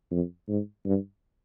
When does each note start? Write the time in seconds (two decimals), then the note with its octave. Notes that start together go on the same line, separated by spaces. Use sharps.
0.11 F2
0.48 G#2
0.85 G2